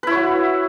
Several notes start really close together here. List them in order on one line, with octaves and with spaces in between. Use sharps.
B4 E4 C#5 F#4